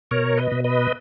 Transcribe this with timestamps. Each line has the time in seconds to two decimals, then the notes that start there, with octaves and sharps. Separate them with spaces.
0.11 B2 A#4 C#5
0.37 B4 D#5
0.51 B2
0.64 B4 D#5